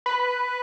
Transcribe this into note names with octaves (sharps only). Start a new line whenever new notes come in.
B4